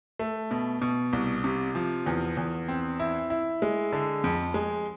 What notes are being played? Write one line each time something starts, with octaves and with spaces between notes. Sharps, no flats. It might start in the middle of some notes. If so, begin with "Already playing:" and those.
A3
B2
B2
C2
C3
F3
E2
E2
C4
E4
E4
G#3
D3
F2
G#3